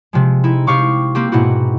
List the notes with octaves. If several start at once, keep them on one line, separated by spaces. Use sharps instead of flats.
C3 F3 G#3
D#4 E4
C3 G4 F5 C#6 D6
A#3 C4 G4
G#2 B2 D#4 E4 F#4 G4